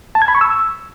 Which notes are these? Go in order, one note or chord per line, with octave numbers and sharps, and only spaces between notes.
A5
G#6
B5
C#6
E6